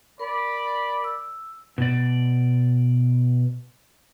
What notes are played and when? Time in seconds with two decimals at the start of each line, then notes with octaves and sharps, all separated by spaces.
0.19 A#4 D5 B5
1.04 E6
1.78 B2 D5